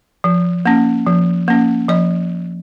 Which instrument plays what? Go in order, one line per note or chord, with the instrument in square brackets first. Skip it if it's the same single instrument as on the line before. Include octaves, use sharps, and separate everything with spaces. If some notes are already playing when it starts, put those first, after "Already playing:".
[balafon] F3
A#3 C#4
F3
A#3 C#4
F3 D#5